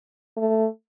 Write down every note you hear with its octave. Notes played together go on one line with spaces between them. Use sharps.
A3